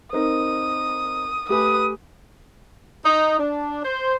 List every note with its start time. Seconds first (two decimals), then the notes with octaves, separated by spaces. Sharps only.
0.13 C4 D#4 A#4 D#6
1.49 A3 G4 B4 G#5 D#6
3.06 D#4
3.39 D4
3.83 C5